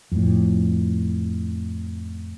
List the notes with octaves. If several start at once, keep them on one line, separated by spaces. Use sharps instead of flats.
F2 A2